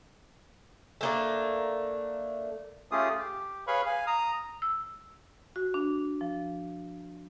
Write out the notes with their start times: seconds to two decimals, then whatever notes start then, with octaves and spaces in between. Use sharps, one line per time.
1.01 A3 A#3 D4
2.91 A3 C#4 F4 G4 G#4 D#6
3.18 G4
3.67 G#4 B4 C#5 F5 B5 C#6
3.86 F5 G#5
4.07 A#5 D#6
4.62 E6
5.56 F#4
5.74 D4
6.21 F3